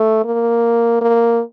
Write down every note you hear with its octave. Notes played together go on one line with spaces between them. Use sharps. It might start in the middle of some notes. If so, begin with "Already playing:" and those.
Already playing: A3
A#3
A#3